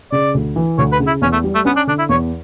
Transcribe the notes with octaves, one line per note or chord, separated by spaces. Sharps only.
C#3 D5
D2
E3
D2 C#5
B4
C#3
E4
E2 C#4
A3
G3
A3
B3 C#4
D4
D3 D4
E4
E2 C#5